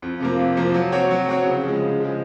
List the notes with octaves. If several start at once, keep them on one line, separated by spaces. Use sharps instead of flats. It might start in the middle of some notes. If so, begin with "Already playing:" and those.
F2
C3 F3 A#3
F2
C3 F3 A#3
F#3
C4 F#4 C#5
F#3
C4 F#4 C#5
C#3
F3 G#3
C#3
F3 G#3